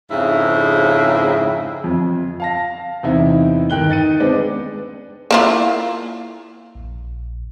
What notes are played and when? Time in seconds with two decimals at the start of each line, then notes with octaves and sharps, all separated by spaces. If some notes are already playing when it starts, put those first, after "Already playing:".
0.11 F2 G#2 C#3 E4
1.84 F2
2.40 F5 A5 A#6
3.03 E2 C3 D#4 E4
3.70 G1 D#3 G5 F#6 G7
3.89 D#4 A6 C#7 D#7
4.20 G#3 B3 C4 D4 D5
5.31 A#3 E4 F4
6.75 A#1